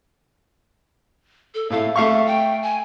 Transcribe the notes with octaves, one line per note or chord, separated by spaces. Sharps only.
A4
A2 A3 F5
A3 E5 F5 C#6
G5
G#5